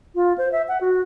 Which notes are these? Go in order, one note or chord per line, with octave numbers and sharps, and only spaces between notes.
F4
C5
E5
F#5
F#4